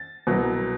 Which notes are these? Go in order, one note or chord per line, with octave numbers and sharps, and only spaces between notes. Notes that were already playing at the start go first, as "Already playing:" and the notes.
Already playing: A6
C2 B2 F#3